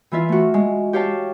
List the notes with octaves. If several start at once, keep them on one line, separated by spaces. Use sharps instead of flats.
E3 E4 F4 E5
A3 F#4
G#3
G4 C#5 F5 G5 A5